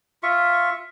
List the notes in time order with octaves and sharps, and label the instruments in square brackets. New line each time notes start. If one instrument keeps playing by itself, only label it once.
[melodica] F4 E5 C#6